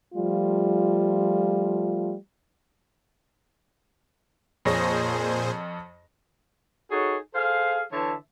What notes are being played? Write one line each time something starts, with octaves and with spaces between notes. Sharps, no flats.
F3 G3 A3 F4
F2 A#2 G#4 C5 C#5 A#6
D#4 F#4 G#4 A4 C#5
G#4 A4 C5 F5
D3 E3 C#5 E5 A5